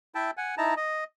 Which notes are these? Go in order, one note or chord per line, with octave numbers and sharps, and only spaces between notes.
E4 E5 G5 A5
F#5 G#5
D#4 E4 A5 A#5
D#5